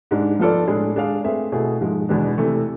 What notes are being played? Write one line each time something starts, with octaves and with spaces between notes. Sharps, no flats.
G#2 G#3 D4
F3 B3 F4 A4 D5
A2 G#3 D4 G#4
G#3 D4 G#4 D5 F5
A3 C4 G#4 B4 E5
B2 A3 E4 G#4
G#2 F3 G#3
E2 B2 G#3 B3 D4
C3 E3 A3